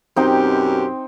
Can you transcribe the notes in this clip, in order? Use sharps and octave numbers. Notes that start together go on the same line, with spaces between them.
F#2 B2 C4 D#4 G4 G5